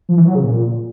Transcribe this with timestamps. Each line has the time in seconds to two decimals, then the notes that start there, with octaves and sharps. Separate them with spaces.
0.09 F3
0.18 E3
0.26 F#3
0.35 C#3
0.44 A#2